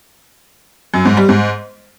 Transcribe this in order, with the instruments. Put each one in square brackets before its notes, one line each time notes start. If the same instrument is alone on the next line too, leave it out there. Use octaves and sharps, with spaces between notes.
[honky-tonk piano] F#2
G#2
G3
G#2